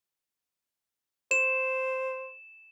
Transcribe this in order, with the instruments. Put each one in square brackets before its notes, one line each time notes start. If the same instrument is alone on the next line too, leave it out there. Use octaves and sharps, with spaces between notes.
[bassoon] C5 [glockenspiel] E7